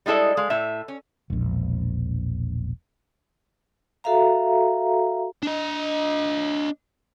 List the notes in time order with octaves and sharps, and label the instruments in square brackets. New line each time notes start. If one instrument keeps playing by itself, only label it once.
[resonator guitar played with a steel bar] G3 G#3 E4 A4 D#5
G#3 F5
A2 E5
C#4
[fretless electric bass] E1 A#1
[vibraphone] F#4 A4 E5 F5 A#5
[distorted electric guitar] D4 D#5